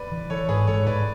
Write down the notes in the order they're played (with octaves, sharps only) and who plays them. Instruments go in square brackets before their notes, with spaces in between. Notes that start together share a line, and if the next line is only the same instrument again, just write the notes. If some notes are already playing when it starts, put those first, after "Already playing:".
Already playing: [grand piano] B4 D5
[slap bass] E3
[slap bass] E3 [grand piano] A4 C#5
[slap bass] G#2 [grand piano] G#4 B4
[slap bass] G#2 [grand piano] A4 C#5
[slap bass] G#2 [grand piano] B4 D5